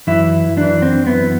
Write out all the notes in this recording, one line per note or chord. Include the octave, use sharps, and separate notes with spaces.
F#2 E3 E4
F#2 E3 D4
C4
F#2 E3 B3